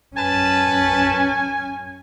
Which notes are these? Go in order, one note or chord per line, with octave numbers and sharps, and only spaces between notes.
F#2 C#4 B4 G#5 A5